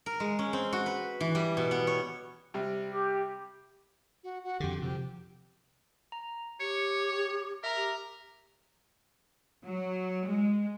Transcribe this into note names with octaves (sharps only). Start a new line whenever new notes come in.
A#4
G#3
C#4
C4
F#4
B4
E3
G3
B2
B3
C#5
C3 G3
G4
F#4
F#4
F2 D3 G4
C3 F3 G4
A#5
G4 C#5 C#7
A#4 E5 A#5
G4
F#3
G#3